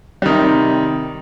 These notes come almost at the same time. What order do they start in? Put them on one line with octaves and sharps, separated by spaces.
G3 D#3 C3